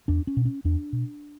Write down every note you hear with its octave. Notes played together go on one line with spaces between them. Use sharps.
E2 D4
C#4
B2
C#4
E2 D4
B2